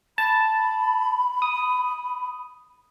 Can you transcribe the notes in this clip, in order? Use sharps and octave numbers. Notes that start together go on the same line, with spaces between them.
A5 B5
D#6